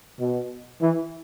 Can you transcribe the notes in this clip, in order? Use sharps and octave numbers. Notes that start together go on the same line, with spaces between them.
B2
E3